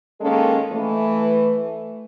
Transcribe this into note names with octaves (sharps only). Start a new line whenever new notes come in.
D#3 G#3 A#3 C#4 A4
E3 A3